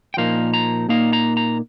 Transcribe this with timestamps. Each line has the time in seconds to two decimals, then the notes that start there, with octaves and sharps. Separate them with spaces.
0.14 G5
0.17 A#2 F3 A#3 D#4 F5
0.54 A#5
0.89 A#2 A#3 D#4 F5
1.13 A#5
1.37 A#5